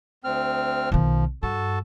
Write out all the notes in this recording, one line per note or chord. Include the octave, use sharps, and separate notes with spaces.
D2 C4 F6
B1 D#3 F3
G2 F#4 A4 A5